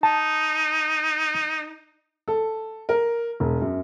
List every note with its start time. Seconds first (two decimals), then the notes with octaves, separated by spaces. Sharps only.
0.03 D#4 A5
2.28 A4
2.89 A#4
3.40 E1
3.61 F#2